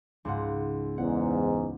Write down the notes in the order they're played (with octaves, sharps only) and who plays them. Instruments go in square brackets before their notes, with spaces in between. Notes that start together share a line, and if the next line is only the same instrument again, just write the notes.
[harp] C#2 G#2 F#5
[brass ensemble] E2 G#2 [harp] F#5